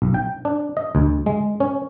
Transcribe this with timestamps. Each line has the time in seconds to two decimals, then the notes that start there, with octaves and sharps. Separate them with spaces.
0.02 B1
0.14 G5
0.45 D4
0.77 D#5
0.95 D2
1.26 G#3
1.60 C#4